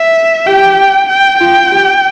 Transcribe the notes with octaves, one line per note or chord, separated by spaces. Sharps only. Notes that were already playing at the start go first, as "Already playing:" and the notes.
Already playing: E5
G4 G5
G5
F4 G5
G4